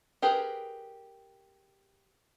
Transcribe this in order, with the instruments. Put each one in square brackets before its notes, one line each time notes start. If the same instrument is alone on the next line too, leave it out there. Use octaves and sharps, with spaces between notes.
[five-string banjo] G4 G#4 A#4 B4